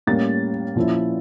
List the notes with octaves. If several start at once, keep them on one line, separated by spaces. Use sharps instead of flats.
A2 G3 A#3 C#4 A6
A#2 F3 C#4 E4